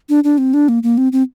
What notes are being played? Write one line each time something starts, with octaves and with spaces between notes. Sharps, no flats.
D4
D4
C4
D4
A#3
A#3
C4
C4